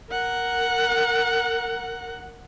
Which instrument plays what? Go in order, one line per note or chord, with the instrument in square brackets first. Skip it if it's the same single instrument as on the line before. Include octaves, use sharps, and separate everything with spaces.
[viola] A#4 F#5